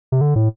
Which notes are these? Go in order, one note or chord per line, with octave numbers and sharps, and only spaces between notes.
C3
D3
A2